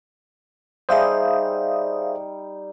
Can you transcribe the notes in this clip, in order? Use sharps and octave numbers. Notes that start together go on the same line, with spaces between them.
G3 D#4 G#4 C5 E5 F5 D#6